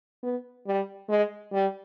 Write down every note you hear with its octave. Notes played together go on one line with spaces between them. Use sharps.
B3
G3
G#3
G3